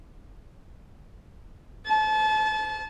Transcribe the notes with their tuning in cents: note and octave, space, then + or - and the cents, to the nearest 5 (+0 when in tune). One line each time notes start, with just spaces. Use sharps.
A5 -30